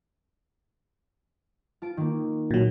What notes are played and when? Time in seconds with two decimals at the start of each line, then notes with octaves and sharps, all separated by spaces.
1.82 F4 A5 D7
1.97 D#3 A#3
2.51 A#2 F#3